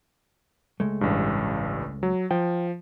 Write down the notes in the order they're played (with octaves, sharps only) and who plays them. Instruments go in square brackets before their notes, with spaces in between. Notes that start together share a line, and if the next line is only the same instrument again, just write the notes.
[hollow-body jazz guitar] C#2 G#3 A3
[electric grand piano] A1 G2
F#3
[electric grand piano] F3 [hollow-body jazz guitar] G5